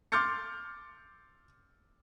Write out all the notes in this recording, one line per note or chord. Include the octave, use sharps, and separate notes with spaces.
C6 D6 F6 G6 A6 C#7